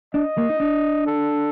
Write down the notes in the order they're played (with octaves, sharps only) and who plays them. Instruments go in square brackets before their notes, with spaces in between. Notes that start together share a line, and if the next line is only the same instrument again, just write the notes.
[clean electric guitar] D4 [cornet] D#5
[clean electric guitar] A#3
D#4
D4
[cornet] A4